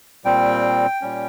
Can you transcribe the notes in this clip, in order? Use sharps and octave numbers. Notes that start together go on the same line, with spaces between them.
A#2 G3 C4 G5
A#2 G3 C#4